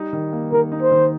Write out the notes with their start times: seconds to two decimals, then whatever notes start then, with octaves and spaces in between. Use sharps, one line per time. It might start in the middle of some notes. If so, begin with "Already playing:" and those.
Already playing: G3 D#4
0.13 D#3
0.33 A#3
0.52 D#3 A#4
0.72 D#4
0.82 C5
0.91 D#3